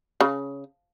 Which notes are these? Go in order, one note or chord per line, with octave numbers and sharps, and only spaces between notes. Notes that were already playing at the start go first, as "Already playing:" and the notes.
C#3